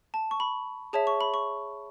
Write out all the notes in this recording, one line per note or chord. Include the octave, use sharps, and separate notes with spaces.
A5
C#6
B5
G#4 C#5 E5 A5
C#6
B5
C#6